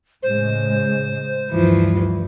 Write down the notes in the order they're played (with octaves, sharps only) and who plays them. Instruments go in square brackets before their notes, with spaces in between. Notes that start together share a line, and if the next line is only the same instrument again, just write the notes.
[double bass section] A2 C#3 G#3 [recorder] C5
[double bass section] D2 G2 [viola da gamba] E3 F3